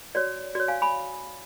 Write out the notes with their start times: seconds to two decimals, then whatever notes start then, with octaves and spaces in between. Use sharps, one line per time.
0.15 F#4 C#5 D5
0.55 F#4 C#5 D5
0.68 F5 G#5
0.82 G#5 B5